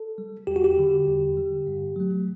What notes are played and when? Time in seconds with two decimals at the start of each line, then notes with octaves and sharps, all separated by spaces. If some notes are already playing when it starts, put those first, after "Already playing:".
Already playing: A4
0.18 G3
0.47 E2 G4
0.56 F#4
0.64 G4
0.77 D3 G3
1.07 E2
1.36 D3 G3
1.67 G2
1.96 F#3 A3